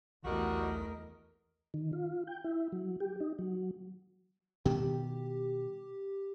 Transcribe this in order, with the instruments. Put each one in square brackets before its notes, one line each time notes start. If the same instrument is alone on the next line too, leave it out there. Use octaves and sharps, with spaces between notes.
[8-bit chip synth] B1 [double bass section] E2 A3 [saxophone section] G3 F#4 [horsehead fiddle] A#4 D#5
[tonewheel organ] D#3
F4
G5
E4
F#3
G4
D#4
F#3
[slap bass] B2 D#3 G3 [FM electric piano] G4